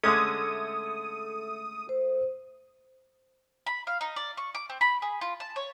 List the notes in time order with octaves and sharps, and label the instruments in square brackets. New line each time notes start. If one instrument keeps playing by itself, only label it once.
[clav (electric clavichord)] D3 G#3 C#4 [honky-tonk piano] A3 G#6 [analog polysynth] D#6
[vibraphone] C5
[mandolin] B5
F5
D#4
D5
C#6
D6
C4
B5
G#4
F4
A5
C#5